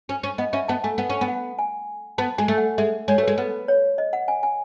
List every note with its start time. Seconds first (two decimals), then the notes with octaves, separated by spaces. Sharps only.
0.09 C#4
0.23 C#4
0.38 B3 D#5
0.53 C#4 E5
0.68 B3 A5
0.83 A3 G#5
0.98 B3 F#5
1.10 C#4
1.21 B3
1.28 F#5
1.59 G#5
2.18 B3 A5
2.38 G#3 G#5
2.48 A3
2.58 F#5
2.78 G#3 E5
3.08 G#3 C#5
3.18 A3
3.23 G#3 B4
3.38 B3 B4
3.68 C#5
3.98 D#5
4.13 F#5
4.28 G#5
4.43 G#5